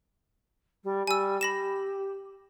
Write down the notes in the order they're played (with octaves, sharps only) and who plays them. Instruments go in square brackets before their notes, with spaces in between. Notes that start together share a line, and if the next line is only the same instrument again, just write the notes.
[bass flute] G3
[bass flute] G3 [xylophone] G#5 E6
[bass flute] G4 [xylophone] B5 A#6 E7